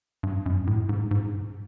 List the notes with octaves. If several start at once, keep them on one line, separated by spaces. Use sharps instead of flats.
G2
F#2
A2
G#2
G#2